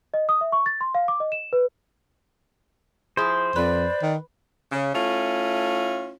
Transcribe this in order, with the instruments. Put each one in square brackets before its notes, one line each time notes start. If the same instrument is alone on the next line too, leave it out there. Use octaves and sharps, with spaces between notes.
[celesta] D#5
D#6
E5
C#6
A6
C6
F5
D6
D#5
E7
B4
[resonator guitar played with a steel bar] F3 E4 G#4 [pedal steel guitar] C5
[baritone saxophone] F2 [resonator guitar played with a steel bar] B4 [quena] D5
[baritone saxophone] D#3
[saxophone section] C#3
A3 C#4 E4 F4